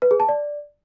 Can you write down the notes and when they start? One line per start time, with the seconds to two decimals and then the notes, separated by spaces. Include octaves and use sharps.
0.02 B4
0.11 G#4
0.20 A5
0.29 D5